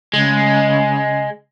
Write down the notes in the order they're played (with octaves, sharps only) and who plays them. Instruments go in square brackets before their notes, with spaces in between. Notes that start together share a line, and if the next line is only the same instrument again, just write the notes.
[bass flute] C#3 [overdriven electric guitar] G#3